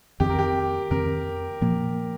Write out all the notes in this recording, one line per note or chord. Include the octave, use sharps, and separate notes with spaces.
F2 D#3 C4 G4
A#4
G4
F2 D#3 C4 A#4
A#2 F3 A#3